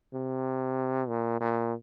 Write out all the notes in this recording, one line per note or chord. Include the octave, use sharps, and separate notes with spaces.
C3
A#2
A#2